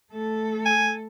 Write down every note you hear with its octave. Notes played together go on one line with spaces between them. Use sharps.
A3 A4
G#5